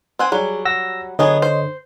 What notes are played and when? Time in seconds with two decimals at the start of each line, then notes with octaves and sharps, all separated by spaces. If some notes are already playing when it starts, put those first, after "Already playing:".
0.19 C4 F#5 G#5
0.32 F#3 G3 G#4
0.65 F#5 E6 A#6
1.19 D3 F#3 B3 G#4 C#5 D#5
1.42 C5